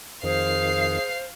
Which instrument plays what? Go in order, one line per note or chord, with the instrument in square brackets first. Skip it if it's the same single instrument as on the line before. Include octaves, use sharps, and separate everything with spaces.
[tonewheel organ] F2 D#3 [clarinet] G#4 [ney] C5 [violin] F5 C7